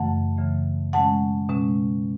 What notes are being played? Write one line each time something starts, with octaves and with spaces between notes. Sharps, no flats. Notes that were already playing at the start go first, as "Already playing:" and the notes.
Already playing: F#2 C#3 E3 A3 F#5 A5
F#2 C#3 E3 A3
B2 G#3 C#4 F#5 A5
B2 G#3 C#4